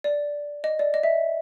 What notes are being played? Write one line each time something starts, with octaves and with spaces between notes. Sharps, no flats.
D5
D#5
D5
D#5
E5